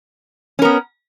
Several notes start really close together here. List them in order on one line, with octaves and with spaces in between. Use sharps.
C#4 A#4 B3